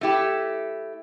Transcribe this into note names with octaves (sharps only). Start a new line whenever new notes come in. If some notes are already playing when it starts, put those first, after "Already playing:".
A3 E4 G4